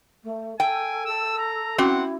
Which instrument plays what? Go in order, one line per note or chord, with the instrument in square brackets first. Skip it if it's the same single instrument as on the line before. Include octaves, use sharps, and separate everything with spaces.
[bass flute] A3
[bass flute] A4 [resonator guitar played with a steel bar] G5 [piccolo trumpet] G#5
[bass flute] A4 [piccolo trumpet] E6
[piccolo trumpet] A#5
[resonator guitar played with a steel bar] C4 [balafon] C#4 F#4 D6 [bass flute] E4 [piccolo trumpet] F#5